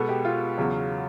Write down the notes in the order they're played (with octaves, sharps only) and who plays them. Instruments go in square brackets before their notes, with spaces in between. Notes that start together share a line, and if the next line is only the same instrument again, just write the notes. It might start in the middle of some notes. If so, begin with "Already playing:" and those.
Already playing: [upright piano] B2 G#3 B3 A4
G4
F4
E2 C#3 F#3